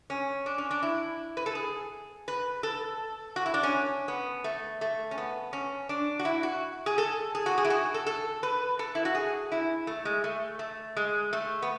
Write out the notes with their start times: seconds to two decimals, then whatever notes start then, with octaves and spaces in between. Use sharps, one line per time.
0.10 C#4
0.46 D4
0.58 C#4
0.71 D4
0.83 E4
1.37 B4
1.46 A4
1.55 G#4
2.28 B4
2.63 A4
3.36 F#4
3.46 E4
3.54 D4
3.63 C#4
4.08 B3
4.44 A3
4.81 A3
5.11 C#4
5.18 B3
5.53 C#4
5.89 D4
6.19 F#4
6.25 E4
6.43 F#4
6.86 G#4
6.98 A4
7.35 G#4
7.46 F#4
7.58 G#4
7.65 E4
7.70 F#4
7.94 A4
8.06 A4
8.43 B4
8.79 A4
8.95 E4
9.05 F#4
9.15 G#4
9.52 E4
9.87 A3
10.05 G#3
10.24 A3
10.59 A3
10.97 G#3
11.33 A3
11.62 B3